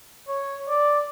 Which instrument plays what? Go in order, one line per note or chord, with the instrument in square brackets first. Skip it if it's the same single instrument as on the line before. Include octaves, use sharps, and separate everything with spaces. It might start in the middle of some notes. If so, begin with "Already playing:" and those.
[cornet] C#5
D5